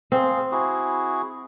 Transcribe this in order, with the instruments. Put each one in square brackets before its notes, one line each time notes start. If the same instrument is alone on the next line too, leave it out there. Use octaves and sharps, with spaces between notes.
[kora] C4 [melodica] G#4 F5
[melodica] E4 F#4 G#4